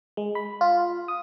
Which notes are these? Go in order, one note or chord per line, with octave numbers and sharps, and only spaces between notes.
G#3
B5
F4
D#6